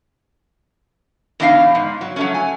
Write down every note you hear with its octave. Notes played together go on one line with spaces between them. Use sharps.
E2 B2 D4 D#4 F4 F5
G#2
F#3
F#3 A3 C#4
G#5